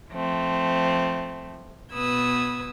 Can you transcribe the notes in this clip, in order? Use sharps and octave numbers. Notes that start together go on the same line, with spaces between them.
F3 A3 C4
B2 B3 B4 D#6 E6 G#6